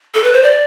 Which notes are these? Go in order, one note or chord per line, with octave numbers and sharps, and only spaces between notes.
A4
B4
C5
D5